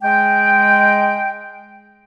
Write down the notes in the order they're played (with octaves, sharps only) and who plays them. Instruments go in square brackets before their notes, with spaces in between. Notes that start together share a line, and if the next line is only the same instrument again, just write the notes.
[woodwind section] G#3 G5